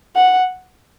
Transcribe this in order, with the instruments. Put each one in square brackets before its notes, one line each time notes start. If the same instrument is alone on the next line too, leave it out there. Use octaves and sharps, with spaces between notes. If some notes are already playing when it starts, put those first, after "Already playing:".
[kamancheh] F#5